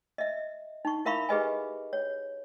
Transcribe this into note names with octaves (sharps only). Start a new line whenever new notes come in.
D#5 E5
D#4 C#6
E4 A#4 E5 F5 B5 C#6
G4 G#4 B4 D#5 G#5
C#5